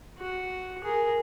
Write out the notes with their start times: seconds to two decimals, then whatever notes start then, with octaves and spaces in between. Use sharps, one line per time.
0.19 F#4
0.84 G#4 A#4